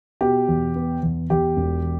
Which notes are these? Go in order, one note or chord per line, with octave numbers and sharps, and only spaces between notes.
B2 G4
E2
B3
E2
E2 G4
E1